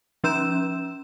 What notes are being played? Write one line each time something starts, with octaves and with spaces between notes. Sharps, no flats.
F3 C#4 E6 G6 E7